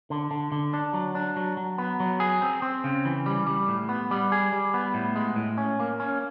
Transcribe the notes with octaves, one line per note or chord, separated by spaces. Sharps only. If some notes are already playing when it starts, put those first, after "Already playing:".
D3
D3
D3
D4
F#3
D4
F#3
F#3
B3
F#3
G#4
C4
C4
C#3
E3
G3
G3
A2
B3
G3
G#4
G3
B3
A2
G#3
A2
C#4
A#3
C#4